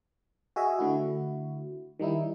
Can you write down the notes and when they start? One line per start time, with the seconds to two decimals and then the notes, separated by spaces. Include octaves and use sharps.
0.56 F#4 G#4 D#5 E5
0.79 D3 A3 E4 F#4
2.00 D#3 G3 D#4 E4